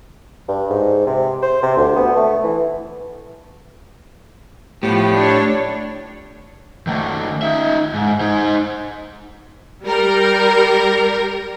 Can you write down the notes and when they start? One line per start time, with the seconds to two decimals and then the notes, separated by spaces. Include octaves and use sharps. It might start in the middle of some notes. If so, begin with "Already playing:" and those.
0.48 G2
0.70 G#2
1.07 C3
1.42 C5
1.63 C3
1.77 D2
1.96 B3
2.16 A3
2.44 E3
4.83 A2 F3 B3 G4
5.14 D4 C#5
6.87 D#3 A3
7.42 D#4 E5
7.94 G#2
8.21 D#4 C5
9.85 G3 A#4